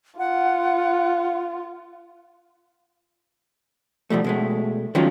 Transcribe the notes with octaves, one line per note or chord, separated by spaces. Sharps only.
F4 F#5
B2 F3 G3 A3
B2 G#3 A3
D#3 F3 F#3 G#3 C#4 F4